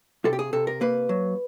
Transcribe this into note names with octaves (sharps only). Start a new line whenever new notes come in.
C3 A4
G4
G#4
C3 A4
A#4
A#3 B4
F#3